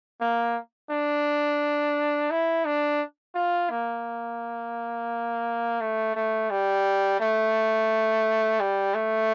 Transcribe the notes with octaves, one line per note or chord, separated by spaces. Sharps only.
A#3
D4
E4
D4
F4
A#3
A3
A3
G3
A3
G3
A3